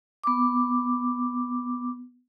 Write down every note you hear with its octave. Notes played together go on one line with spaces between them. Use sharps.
B3 D6